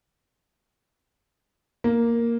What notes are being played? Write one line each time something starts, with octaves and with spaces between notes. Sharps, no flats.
A#3